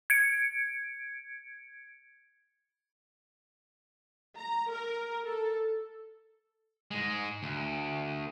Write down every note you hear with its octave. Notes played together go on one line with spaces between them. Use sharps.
G#6 C#7 D7
A#5
A#4
A4
G#2 G#3
D2